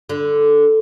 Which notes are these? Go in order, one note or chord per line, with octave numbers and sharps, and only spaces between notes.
D3